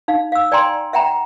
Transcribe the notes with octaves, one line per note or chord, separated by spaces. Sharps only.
D#4 F5
F5 E6
D5 G5 G#5 A#5 C6
E5 F#5 G5 A#5 B5